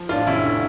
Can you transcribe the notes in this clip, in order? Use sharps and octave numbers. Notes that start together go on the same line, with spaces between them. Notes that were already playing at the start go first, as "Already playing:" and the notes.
Already playing: F3
A1 D4 F4
F1 C#4 E4
D3